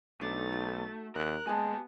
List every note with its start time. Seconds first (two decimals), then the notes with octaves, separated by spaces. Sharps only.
0.21 B1 A3 D4 D#4 A6
0.53 F#4
1.15 D#2 A#4 F#6
1.47 A#2 G#3 B3 G4 G#5 A5